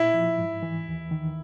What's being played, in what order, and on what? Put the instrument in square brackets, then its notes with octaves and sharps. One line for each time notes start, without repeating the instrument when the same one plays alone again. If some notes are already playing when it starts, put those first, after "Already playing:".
Already playing: [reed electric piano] A#2 [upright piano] E4
[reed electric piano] F3
G#2
E3
D#2
D#3